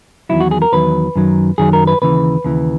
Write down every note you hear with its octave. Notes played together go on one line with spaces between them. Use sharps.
E2 D#3 F#3 E4
F#4
G#4
A#4
E2 D#3 F#3 B4
F#2 D#3 F#3
F#2 D#3 F#3 G#4
A#4
B4
D#2 C#3 E3 B4
D#2 C#3 E3